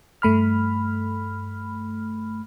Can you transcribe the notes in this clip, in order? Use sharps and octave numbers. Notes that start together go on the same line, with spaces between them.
G2 A3 B5 F6